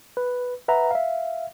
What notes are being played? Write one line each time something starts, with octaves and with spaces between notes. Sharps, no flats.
B4
B4 E5 F#5 A#5
E5 F5